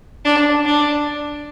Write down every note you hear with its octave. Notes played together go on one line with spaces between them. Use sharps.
D4
D4